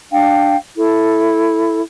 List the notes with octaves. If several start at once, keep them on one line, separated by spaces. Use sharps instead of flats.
D4 F5 G5
E4 A4